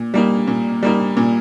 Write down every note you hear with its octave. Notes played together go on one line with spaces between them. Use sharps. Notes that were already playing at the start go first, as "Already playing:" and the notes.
Already playing: A#2
G3 A#3 D#4
A#2
G3 A#3 D#4
A#2